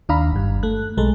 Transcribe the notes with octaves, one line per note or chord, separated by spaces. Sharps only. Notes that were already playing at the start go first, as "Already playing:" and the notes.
D#2 D4 F5 A#5 B5
G1 G2
A3 F#6
B1 G#3 A4